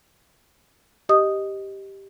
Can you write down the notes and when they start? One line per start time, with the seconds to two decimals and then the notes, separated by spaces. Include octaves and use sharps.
1.09 G4 D#5 D#6